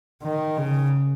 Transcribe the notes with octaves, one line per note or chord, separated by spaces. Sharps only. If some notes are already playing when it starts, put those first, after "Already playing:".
D#3
C#3